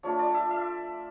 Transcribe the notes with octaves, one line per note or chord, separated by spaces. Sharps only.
F3 A3 D4 F4 C#5
D5
E5
E5